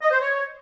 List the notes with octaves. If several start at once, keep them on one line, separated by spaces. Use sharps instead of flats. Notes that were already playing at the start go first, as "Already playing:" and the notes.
D#5
C5
C#5